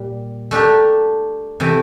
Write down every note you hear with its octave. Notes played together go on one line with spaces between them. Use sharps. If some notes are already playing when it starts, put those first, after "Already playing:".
Already playing: A#2 G3
A3 D4 G4 A#4
C3 E3 A3